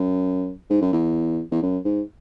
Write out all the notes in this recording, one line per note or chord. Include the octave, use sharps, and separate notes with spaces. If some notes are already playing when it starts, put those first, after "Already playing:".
Already playing: F#2
G#2
F#2
E2
E2
F#2
G#2